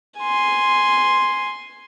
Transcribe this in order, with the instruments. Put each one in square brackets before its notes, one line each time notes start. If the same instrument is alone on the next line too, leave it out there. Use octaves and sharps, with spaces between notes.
[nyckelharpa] G#5 C6